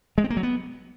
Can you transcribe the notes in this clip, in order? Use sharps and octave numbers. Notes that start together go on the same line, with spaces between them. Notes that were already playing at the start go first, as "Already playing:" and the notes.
G#3
C4
A#3
F#3
B3